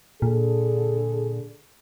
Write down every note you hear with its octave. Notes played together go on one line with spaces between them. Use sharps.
A#2 D3 G#4 A4